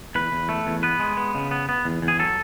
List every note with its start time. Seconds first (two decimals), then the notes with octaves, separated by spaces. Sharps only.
0.15 E2 B4
0.32 E2
0.49 A3
0.67 E2
0.83 B3 B4
1.00 G#3
1.17 B3
1.35 C#3
1.51 B3
1.69 B3
1.85 E2
2.02 E2
2.08 G#4
2.19 F#3 A4